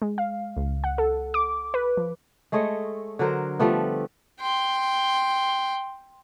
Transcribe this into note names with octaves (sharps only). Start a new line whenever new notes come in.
G#3
F5
C#2
F#5
A4
D6
B4
F3
G#3 A3 C#5 D#5
D3 F#3 A#4 C5
F3 G3 A3 B3
G5 C6